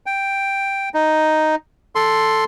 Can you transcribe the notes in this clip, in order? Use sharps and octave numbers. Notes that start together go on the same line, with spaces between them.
G5
D#4
A4 C6